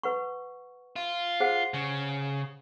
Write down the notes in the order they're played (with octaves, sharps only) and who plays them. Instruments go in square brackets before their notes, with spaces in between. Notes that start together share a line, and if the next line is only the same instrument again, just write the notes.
[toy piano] B4 F#5 C#6
[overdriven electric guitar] F4
[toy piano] G#4 C5 F#5
[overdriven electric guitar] C#3